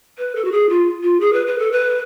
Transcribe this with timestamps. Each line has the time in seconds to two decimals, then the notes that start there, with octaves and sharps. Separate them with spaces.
0.18 B4
0.35 A4
0.45 F#4
0.52 G#4
0.69 F4
1.03 F4
1.20 G#4
1.33 B4
1.47 B4
1.59 A4
1.72 B4